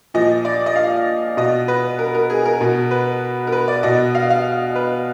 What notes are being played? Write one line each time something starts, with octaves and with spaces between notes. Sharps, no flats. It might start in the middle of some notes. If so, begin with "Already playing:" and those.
A#2 F3 D#5
D5
D#5
F5
B2 D#5
B4
A#4
A#4
G#4
A#4
B2
B4
A#4
B4
D5
B2 D#5
F5
F5
B4